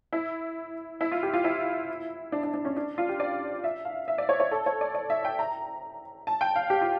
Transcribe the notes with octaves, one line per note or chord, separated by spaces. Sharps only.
E4
E4
F4
G4
F4
E4
D4
D4
D4
C#4
D4
F4
G4
D5
E5
F5
E5
D5
C#5
C#5
A4
C#5
D5
D5
E5
G5
A#5
A5
G5
F5
G4
F4